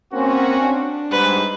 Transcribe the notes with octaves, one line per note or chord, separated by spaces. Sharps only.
A#3 C4 C#4 F#4
D4
G#2 G3 B4 C5